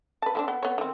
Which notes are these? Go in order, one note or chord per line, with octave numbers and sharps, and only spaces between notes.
B4 A5
F3 C4 D4
B3
B3 C#5
D#3 C4